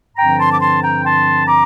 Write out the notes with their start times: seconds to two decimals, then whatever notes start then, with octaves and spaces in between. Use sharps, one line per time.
0.17 G2 D3 F3 C4 G5 A#5
0.39 A5 C6
0.52 D6
0.60 A5 C6
0.82 G5 A#5
1.04 A5 C6
1.47 A#5 D6